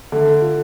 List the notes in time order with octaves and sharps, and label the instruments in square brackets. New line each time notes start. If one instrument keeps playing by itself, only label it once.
[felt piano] D3 [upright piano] A3
[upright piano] F4